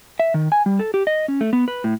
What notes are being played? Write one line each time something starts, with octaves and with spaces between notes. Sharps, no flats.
E5
D#3
G#5
G3
A4
G4
D#5
C#4
A3
B3
B4
A2